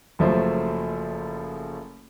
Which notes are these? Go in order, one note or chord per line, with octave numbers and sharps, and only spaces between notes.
F#1 F3 F#3 A3 C5